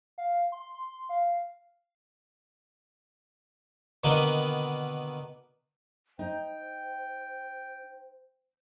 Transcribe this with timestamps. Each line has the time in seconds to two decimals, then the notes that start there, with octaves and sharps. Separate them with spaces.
0.18 F5
0.52 C6
1.09 F5
4.04 B2 D3 D#3 A#3 B3
6.19 D#4 C5 G5